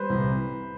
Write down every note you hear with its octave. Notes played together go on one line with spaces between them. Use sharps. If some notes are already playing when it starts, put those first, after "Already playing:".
Already playing: G3 B4 C5
C2